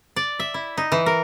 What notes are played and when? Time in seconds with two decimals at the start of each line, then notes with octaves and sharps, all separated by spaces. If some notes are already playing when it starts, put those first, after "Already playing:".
0.16 D5
0.40 E5
0.54 E4
0.77 D#4
0.92 E3
1.06 A#4